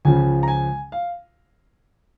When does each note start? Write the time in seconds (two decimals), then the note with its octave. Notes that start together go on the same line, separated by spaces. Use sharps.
0.05 C#2 C#3 F3 G#5
0.43 A#5
0.48 G#5
0.92 F5